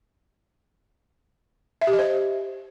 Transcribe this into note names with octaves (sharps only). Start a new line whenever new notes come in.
E5
G4
D#5
C5